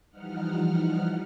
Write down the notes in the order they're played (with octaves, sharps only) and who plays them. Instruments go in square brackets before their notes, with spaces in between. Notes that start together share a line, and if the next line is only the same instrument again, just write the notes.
[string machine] E3 F3 G3 D#4 F#5 F6